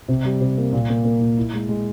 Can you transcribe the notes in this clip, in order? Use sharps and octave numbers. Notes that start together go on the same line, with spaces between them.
C3
G3
C3
A#3
A#2
A#3
A#3
A#2
E4
G#3
G#3